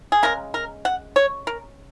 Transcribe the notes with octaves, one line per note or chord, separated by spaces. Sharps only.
G#4
C#3 G#3 A#4
A#4
F#5
C#5
A#4